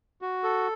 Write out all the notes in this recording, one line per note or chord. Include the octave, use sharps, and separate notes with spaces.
F#4
A4